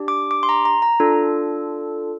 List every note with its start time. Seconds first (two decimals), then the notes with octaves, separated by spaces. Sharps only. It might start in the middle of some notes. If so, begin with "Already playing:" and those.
Already playing: D4 G4
0.08 D6
0.31 D6
0.43 C6
0.49 A#5
0.65 A#5
0.82 A#5
1.00 D4 F4 A4